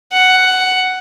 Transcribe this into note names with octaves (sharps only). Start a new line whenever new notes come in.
F#5